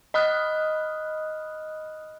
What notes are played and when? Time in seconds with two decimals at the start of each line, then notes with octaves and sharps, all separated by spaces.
0.14 D#5 B5 D#6 F6 F#6